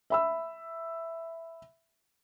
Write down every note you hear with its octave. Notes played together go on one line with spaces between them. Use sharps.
E5 B5 E6